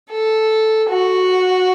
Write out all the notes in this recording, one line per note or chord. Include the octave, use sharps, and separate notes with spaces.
A4
F#4